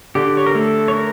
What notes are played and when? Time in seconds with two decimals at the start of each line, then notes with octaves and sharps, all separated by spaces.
0.15 D3 G4
0.37 C#5
0.47 A#4
0.55 A3 A4
0.88 C#5
0.94 A#4